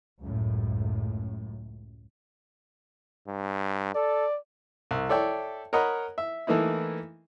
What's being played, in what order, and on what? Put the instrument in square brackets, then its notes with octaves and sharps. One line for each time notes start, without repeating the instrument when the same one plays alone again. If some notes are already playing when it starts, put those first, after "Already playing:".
[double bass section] C#2 F#2 A2
[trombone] G2
[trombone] A4 [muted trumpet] D5
[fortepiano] C2
A4 C#5 D5 E5 G5
A#4 C#5 D#5 F#5 A#5 B5
E5
E3 A3 A#3 D#4 E4